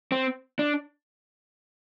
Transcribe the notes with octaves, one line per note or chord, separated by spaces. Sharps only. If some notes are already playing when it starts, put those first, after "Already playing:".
C4
D4